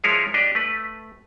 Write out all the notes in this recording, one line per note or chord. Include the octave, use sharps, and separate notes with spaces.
F3 G#3 E4 G#4 A#4 C#5
D4 G4 D5 D#5
A3 B4